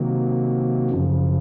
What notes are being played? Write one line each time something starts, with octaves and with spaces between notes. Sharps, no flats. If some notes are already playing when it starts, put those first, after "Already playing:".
Already playing: C3 D#3 F#3 A#3
F#2 C#3 F3